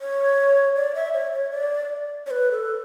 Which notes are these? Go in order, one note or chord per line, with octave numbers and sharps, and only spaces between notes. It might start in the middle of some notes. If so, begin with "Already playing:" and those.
C#5
D5
E5
C#5
C#5
D5
C#5
B4
A4